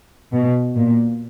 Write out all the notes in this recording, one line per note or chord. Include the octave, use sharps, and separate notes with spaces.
B2
A#2